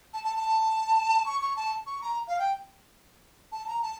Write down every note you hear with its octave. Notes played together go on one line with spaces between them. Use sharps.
A5
A5
A5
C#6
C#6
A5
C#6
A#5
F5
G5
A5
A#5
A5